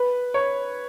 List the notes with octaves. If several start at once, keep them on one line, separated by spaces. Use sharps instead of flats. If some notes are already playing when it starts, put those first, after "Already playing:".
Already playing: B4
C#5